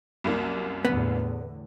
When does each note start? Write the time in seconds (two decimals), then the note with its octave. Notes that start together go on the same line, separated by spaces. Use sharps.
0.24 C2 F#2 A#3
0.85 E2 A2 D3 B3